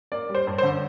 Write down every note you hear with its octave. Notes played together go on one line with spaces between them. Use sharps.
A#3 D5
G3
C5
G2
C5
D3